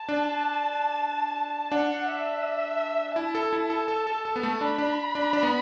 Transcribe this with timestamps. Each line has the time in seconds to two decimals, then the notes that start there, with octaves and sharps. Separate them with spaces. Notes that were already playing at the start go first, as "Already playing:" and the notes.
Already playing: A5
0.09 D4
1.72 D4 F#5
2.08 E5
3.16 E4 A5
3.35 A4
3.53 E4
3.70 A4
3.88 A4
4.07 A4
4.25 A4
4.36 B3
4.43 A3
4.61 D4 B5
4.78 D4
5.15 D4
5.33 D4
5.43 B3